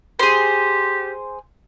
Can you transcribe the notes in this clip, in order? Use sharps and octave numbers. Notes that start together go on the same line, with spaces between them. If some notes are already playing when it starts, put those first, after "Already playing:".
G4 G#4 C5